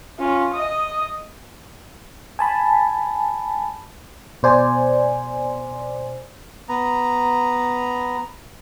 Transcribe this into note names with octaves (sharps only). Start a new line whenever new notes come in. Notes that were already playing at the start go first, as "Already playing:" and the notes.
C#4 F4
D#5 D#6
G#5 A5 B5
B2 C5 D5 G#5
B3 A#5